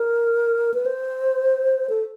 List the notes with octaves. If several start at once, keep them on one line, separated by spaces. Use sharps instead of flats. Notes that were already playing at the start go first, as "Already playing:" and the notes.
Already playing: A#4
B4
C5
A4